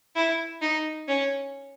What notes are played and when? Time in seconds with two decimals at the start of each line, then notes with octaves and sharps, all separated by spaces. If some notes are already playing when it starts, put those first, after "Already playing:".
0.16 E4
0.62 D#4
1.08 C#4